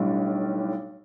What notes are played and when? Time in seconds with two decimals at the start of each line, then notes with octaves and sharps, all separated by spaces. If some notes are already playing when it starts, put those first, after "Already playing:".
Already playing: B1 A2 G3 D4